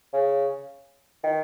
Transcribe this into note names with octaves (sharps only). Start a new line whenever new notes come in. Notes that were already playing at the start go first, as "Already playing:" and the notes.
C#3
D#3